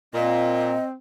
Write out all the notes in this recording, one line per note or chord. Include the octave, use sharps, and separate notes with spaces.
A#2 C4 D#5